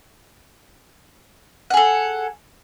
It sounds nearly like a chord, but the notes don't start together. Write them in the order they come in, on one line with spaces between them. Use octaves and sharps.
F#5 G#4 A4